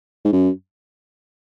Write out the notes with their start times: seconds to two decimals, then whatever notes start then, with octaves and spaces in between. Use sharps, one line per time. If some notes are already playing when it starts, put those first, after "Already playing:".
0.25 G#2
0.33 F#2